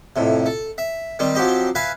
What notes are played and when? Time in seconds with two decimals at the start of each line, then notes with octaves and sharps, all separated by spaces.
0.16 F2 A2 C3
0.46 A4
0.78 E5
1.19 D#3 G3 C4
1.35 F3 F#3 C4 G4 D#5
1.75 B4 E5 F5 G#5